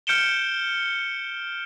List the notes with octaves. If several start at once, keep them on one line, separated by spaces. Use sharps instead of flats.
F6 G6 C#7 D7 E7 G7